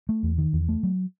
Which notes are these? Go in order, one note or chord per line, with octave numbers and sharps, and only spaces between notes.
A3
E2
D#3
E2
A3
F#3